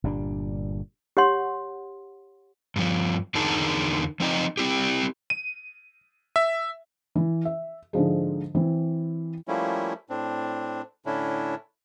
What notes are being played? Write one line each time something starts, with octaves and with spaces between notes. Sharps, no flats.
G1 A#2 G3 D4
G4 C#5 F#5 C6
G2 F3
E2 D3 D#4 G#4 A#4 A5
F3 C4 D#4 D#5
C4 E4 G4
D#7
E5
E3
E5
G#2 D3 F3 G#3
E3 C4
F3 G3 A3 A#3 C#4 E4
A2 C4 D4
A2 D3 C#4 D4 E4